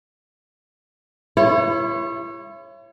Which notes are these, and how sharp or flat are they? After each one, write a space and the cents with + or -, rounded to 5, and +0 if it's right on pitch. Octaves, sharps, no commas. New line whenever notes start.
E4 +40 C#5 -20